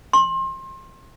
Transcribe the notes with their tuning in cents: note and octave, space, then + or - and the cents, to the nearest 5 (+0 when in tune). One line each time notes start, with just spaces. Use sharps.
C6 +30